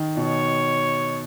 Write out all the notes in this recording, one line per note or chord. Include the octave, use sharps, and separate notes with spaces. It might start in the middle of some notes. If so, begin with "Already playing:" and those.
Already playing: D#3
B2 C#5